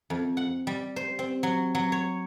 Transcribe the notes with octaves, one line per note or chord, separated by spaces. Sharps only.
F2
F#5
G3
C5
C4
F#3
F#3
C#5